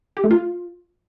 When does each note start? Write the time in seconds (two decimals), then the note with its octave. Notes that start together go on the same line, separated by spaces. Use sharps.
0.17 G4
0.24 A3
0.31 F4